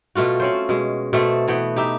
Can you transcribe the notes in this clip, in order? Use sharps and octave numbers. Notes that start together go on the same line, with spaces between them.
B2 A3 F4 F#4
C4 C#4 C5
B2 G#3
B2 A3 C4
E3 B3 G5
D#4 G4 E5